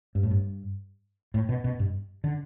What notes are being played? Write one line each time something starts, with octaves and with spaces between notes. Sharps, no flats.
G2
A2
G2
A2
B2
B2
G2
D3